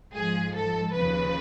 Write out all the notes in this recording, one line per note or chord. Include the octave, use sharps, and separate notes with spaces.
G#2 F3 G#4
A4
D#2 C#3 F3 B4